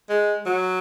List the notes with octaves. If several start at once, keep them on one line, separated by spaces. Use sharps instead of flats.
G#3
F#3